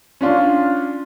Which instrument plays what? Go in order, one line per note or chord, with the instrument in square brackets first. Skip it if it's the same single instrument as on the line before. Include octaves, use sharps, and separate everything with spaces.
[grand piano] C#4 D4 F4